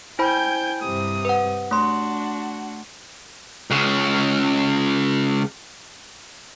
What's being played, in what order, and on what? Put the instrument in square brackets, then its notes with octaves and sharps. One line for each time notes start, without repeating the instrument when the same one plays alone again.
[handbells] E4 C5 B5 [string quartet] G5 G#5 G6
[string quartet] G2 C3 D#6
[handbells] B4 F#5
[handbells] A3 C6 [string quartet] D4 F#4
[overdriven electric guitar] C#2 C#3